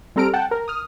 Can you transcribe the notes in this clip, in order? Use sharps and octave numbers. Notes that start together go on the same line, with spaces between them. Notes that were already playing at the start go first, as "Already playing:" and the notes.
G3 C4 A4 A#5 F6 D7
F#5 G5 A5
A#4
D#6 F6